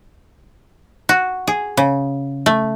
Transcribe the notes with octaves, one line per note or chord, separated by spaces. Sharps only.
F#4
G#4
C#3
A3